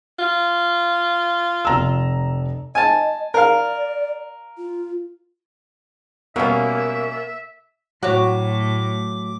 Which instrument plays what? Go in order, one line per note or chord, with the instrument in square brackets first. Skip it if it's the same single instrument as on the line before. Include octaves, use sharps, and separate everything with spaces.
[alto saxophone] F4
[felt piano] F1 A#5 E6
[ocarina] D#5 [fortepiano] G#5 A5
[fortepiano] A#4 F5 [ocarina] D5
[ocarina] F4
[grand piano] B2 G3 B3 [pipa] F#3 C#4 [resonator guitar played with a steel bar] A#3 [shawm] E5
[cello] A2 A3 [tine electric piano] F#3 [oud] F#4 C#5 [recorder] D6